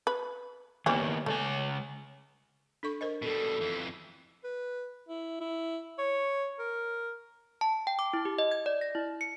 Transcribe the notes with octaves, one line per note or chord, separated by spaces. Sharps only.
B4
D#3 E3 G3 A#3 B3 C#4
C#3 G#3 A3 G#5
D4 A4 C#6
A#4 C5 D#5
B2 G3 A4
F2 E3
B4
E4
E4
C#5
A#4
A5
G5
D6
E4
G4
D#5
G#6
D5
A#6
E4
C#7